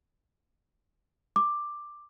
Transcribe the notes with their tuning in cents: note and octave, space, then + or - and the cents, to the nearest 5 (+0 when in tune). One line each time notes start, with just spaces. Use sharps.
D6 +10